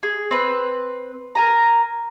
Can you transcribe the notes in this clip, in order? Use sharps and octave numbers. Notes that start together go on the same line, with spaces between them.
G#4
C4 B4
A#4 G#5 A#5